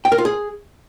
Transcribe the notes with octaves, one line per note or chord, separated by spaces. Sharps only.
G5
A#4
F4
G#4